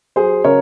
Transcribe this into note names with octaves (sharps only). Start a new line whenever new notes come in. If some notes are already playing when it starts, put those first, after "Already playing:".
F#3 G#4 C5
C#3 A#4 C#5